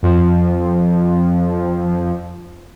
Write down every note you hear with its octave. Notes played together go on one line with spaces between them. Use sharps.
F2 F3